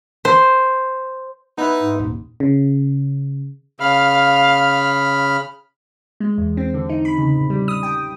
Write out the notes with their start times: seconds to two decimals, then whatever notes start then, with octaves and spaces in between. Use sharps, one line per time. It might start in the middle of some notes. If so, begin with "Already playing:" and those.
0.25 C5
1.58 B3 D#4 E4 B4
1.82 G#2
1.99 D#1
2.40 C#3
3.80 C#3 F5 B5 F6
6.20 G#3
6.38 E2
6.57 C4
6.74 D3
6.89 D#4
7.05 B5
7.18 C#3
7.36 A#1
7.50 G3
7.68 D#6
7.83 G5